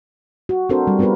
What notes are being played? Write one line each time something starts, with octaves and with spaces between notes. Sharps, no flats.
F#4
C4 D4 F#4 A4 A#4 C5
G3
B3 F4 G4 A#4 B4